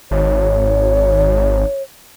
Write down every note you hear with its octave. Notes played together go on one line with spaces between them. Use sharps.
G#1 C#5